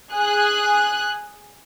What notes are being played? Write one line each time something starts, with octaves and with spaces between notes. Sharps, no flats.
G#4 F#6